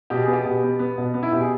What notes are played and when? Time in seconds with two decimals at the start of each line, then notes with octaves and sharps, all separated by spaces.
0.10 B2 G4
0.22 B3 G#4
0.33 G4
0.45 B2
0.63 B3
0.79 B3
0.97 B2
1.14 B3
1.23 E4
1.32 B2 G4
1.40 G#4